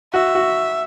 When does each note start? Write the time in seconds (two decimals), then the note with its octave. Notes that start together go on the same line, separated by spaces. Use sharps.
0.13 F#4 E5
0.35 F#4